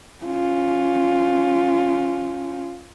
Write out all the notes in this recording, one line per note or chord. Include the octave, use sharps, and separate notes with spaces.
C#4 F4